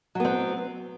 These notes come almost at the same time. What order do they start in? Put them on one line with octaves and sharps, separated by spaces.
F#3 B3 C4